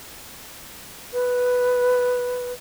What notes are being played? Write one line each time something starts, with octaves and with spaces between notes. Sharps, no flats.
B4